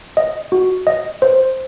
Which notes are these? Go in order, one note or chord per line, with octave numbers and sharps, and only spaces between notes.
D#5
F#4
D#5
C5